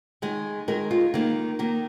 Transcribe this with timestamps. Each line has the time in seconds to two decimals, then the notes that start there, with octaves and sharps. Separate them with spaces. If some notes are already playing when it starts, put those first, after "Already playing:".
0.22 D#3 G#3
0.68 D#3 G#3 A#4
0.91 F4
1.14 D#3 A#3
1.59 D#3 A#3